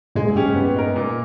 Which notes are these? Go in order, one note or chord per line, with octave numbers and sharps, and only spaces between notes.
G2 A#2 G#3
G#2
G2 C#4 G4
G#2
G2 A#2 B3
D#4 A#4
A#2